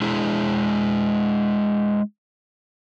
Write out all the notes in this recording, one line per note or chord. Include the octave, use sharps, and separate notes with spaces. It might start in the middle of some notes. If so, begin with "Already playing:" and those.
G#3 D4 E4 G#4